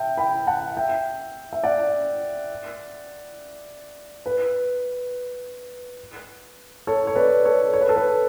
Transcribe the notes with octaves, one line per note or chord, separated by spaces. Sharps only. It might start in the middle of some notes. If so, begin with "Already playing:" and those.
Already playing: E5 G5 A5
G5 B5
F#5 A5
E5 G5
E5
D5 F#5
B4
A4 C#5
C#5
B4 D5
A4 C#5
C#5
B4
A4
B4